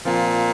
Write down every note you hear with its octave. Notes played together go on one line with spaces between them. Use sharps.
A#2 F3 C4 F4